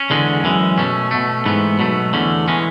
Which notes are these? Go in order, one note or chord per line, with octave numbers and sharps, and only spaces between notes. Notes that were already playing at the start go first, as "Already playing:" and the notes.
Already playing: C#4
E2 D3 G#3
F#2 E3 G#3
B2 A3 C#4
B2 A3
G#2 E3 A3 B3
B2 F#3 A3
E2 D3 A3 C#4
E3 G#3 C#4